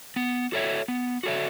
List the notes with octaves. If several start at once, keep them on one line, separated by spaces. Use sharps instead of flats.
B3
F#4 A4 C#5 E5
B3
F#4 A4 C#5 E5